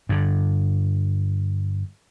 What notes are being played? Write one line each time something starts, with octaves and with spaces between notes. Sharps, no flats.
G2 D3